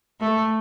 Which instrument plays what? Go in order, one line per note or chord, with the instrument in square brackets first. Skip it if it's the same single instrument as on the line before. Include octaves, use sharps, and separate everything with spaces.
[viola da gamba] A3